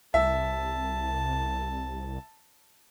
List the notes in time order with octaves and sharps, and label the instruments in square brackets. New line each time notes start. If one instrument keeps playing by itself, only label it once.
[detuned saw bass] C2 [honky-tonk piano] E5 [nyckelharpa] A5